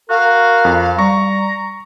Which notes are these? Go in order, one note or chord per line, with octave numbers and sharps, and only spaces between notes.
F#4 A#4 F5
F2
G3 A#5 C#6